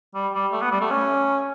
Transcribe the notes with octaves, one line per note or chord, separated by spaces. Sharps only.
G3
G3
A3
B3
G3
A3
C#4